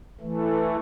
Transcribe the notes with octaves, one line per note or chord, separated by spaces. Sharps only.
E3 A3